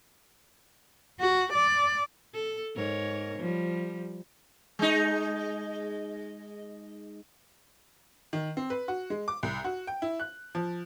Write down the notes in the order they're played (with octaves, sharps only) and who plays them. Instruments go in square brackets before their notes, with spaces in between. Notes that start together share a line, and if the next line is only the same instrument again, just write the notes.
[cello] F#4
D5
[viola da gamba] A4
G#2 A#4 C#5
F3 G3
[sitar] G#3 D#4
[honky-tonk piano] D#3
C4
B4
F#4
G#3
D6
C2
F#4
G5
E4
F#6
F3